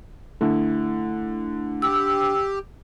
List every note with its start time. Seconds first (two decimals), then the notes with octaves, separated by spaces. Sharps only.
0.41 D3 A3 E4
1.82 G4 E6